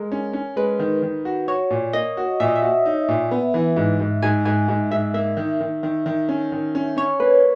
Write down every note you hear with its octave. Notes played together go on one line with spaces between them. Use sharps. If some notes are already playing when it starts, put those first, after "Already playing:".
Already playing: G#3 A#4
C#4
C#4
G#3 B4
D#3
D#3
F#4
F#4 C#5
A#2
A#3 D#5
F#4
A#2 E5
D#5
E5
F#4
D#4
A#2
B3
E3
G#2
G#2
G#2 G#5
G#2 G#5
G#2
G#2 E5
A#3 E5
D#3
D#3
D#3
D#3
C#4
D#3
C#4
C#4 C#5
A#3 B4